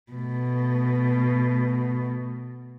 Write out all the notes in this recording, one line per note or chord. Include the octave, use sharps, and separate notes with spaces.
B2 A3